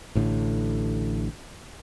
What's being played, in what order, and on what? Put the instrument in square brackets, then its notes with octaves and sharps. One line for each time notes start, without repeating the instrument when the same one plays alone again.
[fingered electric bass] A1 A2 D3